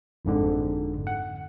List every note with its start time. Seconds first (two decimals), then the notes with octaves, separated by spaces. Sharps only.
0.25 G1 F2 G#2 D3
1.07 F#5